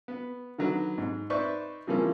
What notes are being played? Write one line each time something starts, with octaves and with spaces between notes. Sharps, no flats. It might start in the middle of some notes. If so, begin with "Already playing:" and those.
B3
D3 D#3 F#3 B4
G#2
D#4 B4 C5 D5 E5 C#6
C#3 E3 F3 G3 A#3 C#4